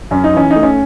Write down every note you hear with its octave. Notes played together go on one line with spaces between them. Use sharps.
F#2 C#4
D#4
E3 C#4
D#4
A3
C#4